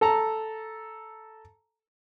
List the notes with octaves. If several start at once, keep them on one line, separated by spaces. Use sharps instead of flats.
A4 A5 A#5